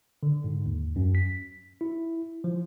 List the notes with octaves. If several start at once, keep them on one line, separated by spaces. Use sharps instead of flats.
D3
G#2
D#2
F#2
B6
E4
F3